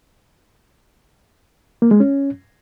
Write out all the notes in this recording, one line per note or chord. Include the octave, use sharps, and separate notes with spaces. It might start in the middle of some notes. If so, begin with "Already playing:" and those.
A#3
G#3
C#4